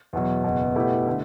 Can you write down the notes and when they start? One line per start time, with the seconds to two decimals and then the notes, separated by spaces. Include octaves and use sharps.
0.13 E2 B2 F#3
0.44 F#1 E2 B2
0.75 B2 A3 E4 G4
1.07 D3 A3